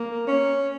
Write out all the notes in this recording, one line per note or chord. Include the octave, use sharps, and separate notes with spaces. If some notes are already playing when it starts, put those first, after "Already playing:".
Already playing: A#3
C#4